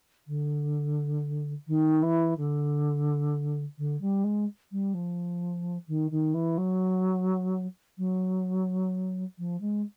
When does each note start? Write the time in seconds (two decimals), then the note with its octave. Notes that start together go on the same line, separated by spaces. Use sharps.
0.27 D3
1.67 D#3
2.02 E3
2.37 D3
3.78 D3
4.01 G3
4.24 G#3
4.71 G3
4.94 F3
5.87 D#3
6.11 D#3
6.34 E3
6.57 F#3
7.98 F#3
9.38 F3
9.61 G#3